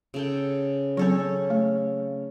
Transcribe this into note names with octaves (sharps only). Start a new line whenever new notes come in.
C#3 A4 G5
F#3 C4 C#4 A4 C#5
A3